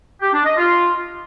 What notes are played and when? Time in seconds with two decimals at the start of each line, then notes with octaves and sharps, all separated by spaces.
0.21 G4
0.33 D4
0.45 D#5
0.57 F4